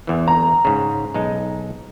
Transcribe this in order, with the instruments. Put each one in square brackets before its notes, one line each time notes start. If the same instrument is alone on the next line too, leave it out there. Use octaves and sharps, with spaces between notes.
[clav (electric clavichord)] E2 E3
[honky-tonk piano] A#5
[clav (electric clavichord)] G#2 C#3
B1 G#3 D#4